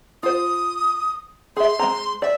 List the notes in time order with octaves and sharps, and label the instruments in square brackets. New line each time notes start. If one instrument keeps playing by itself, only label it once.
[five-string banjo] F4 C5 [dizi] D#6
[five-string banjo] G#4 E5 [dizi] C6
[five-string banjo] G#3 C4 A#5
[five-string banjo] D5 [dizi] E5